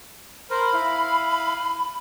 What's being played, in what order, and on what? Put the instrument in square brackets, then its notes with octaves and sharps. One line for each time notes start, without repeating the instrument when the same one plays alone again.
[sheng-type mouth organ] A#4 C5 [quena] B5
[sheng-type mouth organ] E4 F5